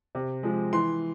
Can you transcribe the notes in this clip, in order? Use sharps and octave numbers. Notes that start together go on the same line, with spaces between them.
C3
F3 G#3
E3 C6